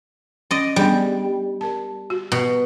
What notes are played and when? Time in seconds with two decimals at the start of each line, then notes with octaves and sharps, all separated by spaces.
0.51 C#4 D5 D#5
0.76 G3 B3 D4 G#4
1.61 A#4 A5
2.10 F#4
2.32 B2